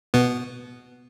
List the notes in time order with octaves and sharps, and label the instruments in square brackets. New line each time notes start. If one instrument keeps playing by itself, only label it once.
[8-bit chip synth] B2 B3